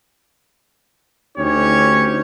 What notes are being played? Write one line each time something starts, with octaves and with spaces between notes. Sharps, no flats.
D2 C#4 D#4 G4 C#5